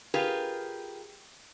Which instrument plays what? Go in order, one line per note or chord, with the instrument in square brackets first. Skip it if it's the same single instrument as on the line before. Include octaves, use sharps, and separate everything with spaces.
[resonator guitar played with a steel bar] F4 G4 G#4 A#4 B4